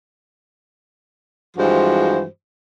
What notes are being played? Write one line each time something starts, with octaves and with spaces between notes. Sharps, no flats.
G2 E3 F3 G#3 F#4 C5